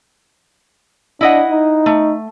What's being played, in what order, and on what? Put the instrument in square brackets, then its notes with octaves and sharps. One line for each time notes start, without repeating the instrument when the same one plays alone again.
[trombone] D4 [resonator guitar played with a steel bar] E4 D#5 F#5
[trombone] D#4
[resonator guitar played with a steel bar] A3